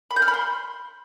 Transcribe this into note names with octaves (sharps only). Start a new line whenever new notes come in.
B5
G6
F6
B5
C6